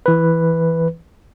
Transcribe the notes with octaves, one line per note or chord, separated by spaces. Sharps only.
E3 B4